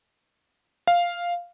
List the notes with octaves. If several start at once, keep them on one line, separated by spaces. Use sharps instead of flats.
F5